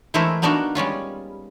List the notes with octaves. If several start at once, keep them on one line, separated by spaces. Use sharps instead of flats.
E3 G#3 A3 E4 A#4 C5
A#3 B3 D4 D#4 F#4 A#4
G3 G#3 C#4 F4